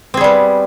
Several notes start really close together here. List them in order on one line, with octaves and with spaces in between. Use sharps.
C4 G#4 G3 B3